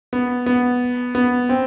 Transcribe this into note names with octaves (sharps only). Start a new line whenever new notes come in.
B3
B3
B3
C4